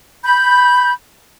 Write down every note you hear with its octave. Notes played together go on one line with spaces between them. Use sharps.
B5 G6